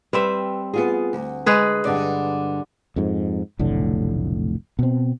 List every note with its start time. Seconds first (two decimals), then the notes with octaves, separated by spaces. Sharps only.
0.13 G3 C4 B4 E5
0.74 B3 F4 G#4
1.13 D2
1.46 G#3 G#4 B4
1.85 G2 D3 D5
2.96 F2 G#2
3.59 F1 B1 A2 D3
4.79 B2 C4